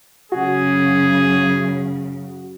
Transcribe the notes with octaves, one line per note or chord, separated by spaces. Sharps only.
F#2 C#3 F#4 G#4